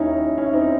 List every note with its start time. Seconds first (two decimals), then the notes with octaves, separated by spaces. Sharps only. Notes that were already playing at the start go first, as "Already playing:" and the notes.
Already playing: D#2 D#3 C#4 D#4 E4
0.38 C#4 E4
0.53 C4 D#4